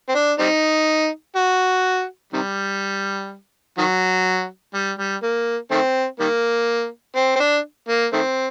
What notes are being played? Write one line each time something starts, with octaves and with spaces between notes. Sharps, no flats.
C4
D4
G3 C4 D#4
F#4
C3 D#3 G3
D#3 F#3
G3
G3
A#3
D#3 A3 C4
D#3 G3 A#3
C4
C4
D4
A#3
D#3 A3 C4